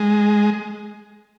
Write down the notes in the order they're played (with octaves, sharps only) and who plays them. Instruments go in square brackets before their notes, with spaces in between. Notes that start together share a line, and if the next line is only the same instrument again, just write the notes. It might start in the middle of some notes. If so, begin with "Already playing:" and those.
Already playing: [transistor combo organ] G#3